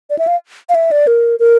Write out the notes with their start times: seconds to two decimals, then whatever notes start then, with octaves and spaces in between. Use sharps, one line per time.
0.10 D5
0.19 E5
0.27 F5
0.69 F5
0.75 E5
0.91 D5
1.07 A#4
1.40 A#4